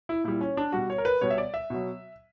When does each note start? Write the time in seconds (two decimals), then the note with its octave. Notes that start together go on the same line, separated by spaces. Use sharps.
0.09 E4
0.24 A#2 G3 E4
0.41 C#4
0.57 D4
0.73 B2 G3 F#4
0.90 C#5
0.98 A#4
1.05 B4
1.21 B2 G3 C#5
1.30 E5
1.38 D5
1.54 E5
1.70 B2 F#3